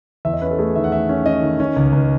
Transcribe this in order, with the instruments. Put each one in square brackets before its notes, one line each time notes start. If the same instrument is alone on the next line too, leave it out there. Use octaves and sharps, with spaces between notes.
[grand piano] E2 E5
D#5
C#4 B4
A4
A3 G#4
D#3 E5
F#5
A3 E5
C#4
C#4 D#5
D#3
C#4
C#2
C#2